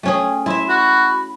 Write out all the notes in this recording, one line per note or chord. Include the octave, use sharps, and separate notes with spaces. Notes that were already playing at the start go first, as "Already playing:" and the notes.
A3 C#4 G#4 G5
E4 E5 C6
F#4 B5